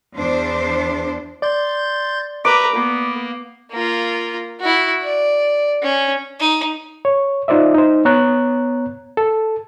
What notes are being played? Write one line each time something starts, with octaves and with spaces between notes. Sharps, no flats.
E2 D4 C5
D5 C6 G6 A6
G4 B4 E5 A#5 D6
A#3 B3
A#3 F4
E4 F#4
D5
C#4
D#4
C#5
D#4 F4 C5 D5 E5
D#4 C5
B3 C#5 A#5 F#6
A4